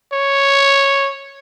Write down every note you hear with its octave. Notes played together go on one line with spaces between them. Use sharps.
C#5